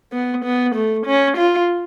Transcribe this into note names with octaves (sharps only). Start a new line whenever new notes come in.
B3
B3
A3
C#4
F4